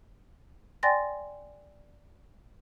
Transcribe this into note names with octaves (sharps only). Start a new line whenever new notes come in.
D5 G5 G#5 C6 A6 A#6